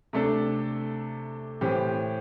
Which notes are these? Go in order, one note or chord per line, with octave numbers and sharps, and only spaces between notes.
C3 A3 D4 A4
A2 E3 C4 G4